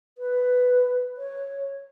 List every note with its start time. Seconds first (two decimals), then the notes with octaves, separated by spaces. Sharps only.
0.18 B4
1.17 C#5